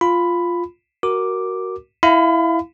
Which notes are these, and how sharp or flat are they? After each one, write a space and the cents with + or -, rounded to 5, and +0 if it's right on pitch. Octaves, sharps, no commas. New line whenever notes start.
F4 +0 B5 +10
F#4 +10 A#4 +0 D6 +0
E4 +0 F5 +0 B5 +35